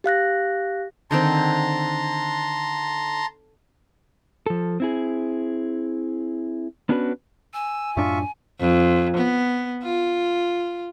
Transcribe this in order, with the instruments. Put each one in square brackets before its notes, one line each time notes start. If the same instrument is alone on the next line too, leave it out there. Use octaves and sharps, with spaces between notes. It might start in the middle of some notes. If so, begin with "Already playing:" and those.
[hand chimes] G4 F5 F#6 A#6
[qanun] D3 D#3 C4 [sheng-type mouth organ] A5 A#5 C6
[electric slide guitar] F3 A4
C4 E4 G#4
B3 C#4 D4 F#4 A4 B4
[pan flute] G#5 [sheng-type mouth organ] E6
[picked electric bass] F#2 A2 D4 [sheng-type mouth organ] F4 E5 C#6
[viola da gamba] F2
B3
F4